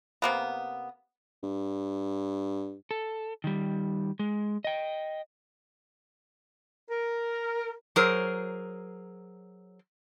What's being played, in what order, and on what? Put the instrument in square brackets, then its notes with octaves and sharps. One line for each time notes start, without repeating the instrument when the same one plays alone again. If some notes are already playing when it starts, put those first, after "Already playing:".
[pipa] C3 A#3 B3
[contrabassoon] G2
[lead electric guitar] A4
D#3 G3
G#3
D#5 G5
[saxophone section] A#4
[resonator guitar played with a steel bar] F#3 G#4 A#4 C5